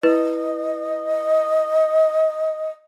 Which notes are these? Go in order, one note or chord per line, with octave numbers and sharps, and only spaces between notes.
E4 B4 D#5